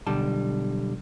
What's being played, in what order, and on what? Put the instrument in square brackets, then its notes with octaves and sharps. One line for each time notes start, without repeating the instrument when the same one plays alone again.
[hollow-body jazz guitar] B1 D3 G3 A5